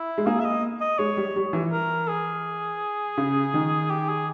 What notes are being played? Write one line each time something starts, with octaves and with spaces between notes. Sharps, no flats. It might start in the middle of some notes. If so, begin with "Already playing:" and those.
Already playing: E4
G#3
A#3 G#4
E5
D#5
D#5
G#3 C#5
G3
G3
E3
A#4
G#4
C#3
D#3
G4
G#4